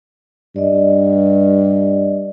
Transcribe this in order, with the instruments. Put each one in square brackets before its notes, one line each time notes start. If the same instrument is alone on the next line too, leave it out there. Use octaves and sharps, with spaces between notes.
[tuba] G2 [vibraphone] D5 D#5